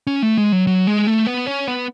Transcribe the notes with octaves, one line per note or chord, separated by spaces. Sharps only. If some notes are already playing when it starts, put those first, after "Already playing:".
C#4
A3
G#3
F#3
F#3
G#3
A3
B3
C#4
B3